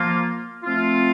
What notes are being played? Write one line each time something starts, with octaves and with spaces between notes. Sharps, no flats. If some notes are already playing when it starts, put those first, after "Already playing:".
Already playing: F3 A#3 F4
F3 A3 C4 F4